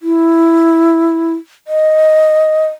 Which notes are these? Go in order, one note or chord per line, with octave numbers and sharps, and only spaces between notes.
E4
D#5